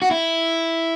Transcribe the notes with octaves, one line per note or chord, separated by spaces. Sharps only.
F#4
E4